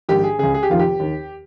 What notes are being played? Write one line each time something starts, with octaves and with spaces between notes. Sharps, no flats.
A#1 G#2 D#3 G4
G#4
C#2 C#3 G#4
G#4
G4
F1 F2 D#3 F4
G4
D#2 D#3